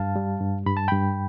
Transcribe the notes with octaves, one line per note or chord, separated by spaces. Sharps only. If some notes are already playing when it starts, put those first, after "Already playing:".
Already playing: G2 F5 A5
G3
G2
G2 B5
A5
G2 G5 B5